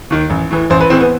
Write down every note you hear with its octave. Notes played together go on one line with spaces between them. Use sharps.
D#2 D#3
A1
A2 E3
A1 C5
B4
A2 E3 C4
B3